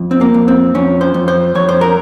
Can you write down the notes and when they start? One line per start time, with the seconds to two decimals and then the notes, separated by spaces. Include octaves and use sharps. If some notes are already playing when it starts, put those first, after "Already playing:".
Already playing: F2
0.11 C4
0.21 A#3
0.34 F2
0.48 C4
0.75 F2 C#4
1.01 C5
1.14 F2
1.28 C5
1.55 F2 C#5
1.69 C5
1.81 A#4